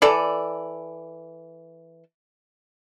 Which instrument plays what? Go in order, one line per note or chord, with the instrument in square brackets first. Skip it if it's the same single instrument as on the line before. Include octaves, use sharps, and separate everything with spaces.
[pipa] E3 A4 D5